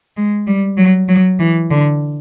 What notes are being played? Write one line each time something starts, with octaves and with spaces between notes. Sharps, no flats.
G#3
G3
F#3
F#3
E3
D3